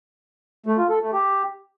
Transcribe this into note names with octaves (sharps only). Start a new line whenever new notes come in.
A3
F4
A4
A3
G4